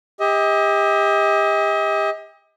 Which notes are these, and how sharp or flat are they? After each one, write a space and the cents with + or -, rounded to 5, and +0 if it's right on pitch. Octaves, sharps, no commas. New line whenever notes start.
G4 +35 D#5 +40